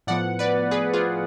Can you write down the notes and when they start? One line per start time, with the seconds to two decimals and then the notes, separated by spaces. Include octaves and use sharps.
0.07 A2 F3 B3 D5 F#5
0.39 B4 D5
0.71 G#4 B4
0.94 F4 G#4